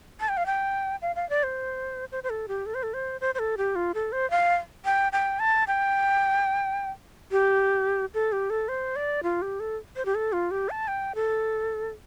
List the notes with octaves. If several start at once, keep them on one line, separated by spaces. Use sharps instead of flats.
A5
G5
F5
G5
F5
F5
D5
C5
C5
C5
A4
G4
A4
C5
A4
C5
C5
C5
A4
G4
F4
A4
C5
F5
G5
G5
A5
G5
G4
A4
G4
A4
C5
D5
F4
G4
A4
C5
G4
A4
F4
G4
A5
G5
A4